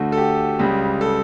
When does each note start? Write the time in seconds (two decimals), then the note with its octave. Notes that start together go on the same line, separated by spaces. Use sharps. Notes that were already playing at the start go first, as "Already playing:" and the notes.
Already playing: D2 D3 A3 F#4
0.12 A4
0.17 G4
0.59 C#2 C#3 G3
1.01 A4